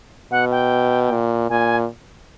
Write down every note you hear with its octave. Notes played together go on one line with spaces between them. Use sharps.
B2 F#5
G5
A#2
A#2 G#5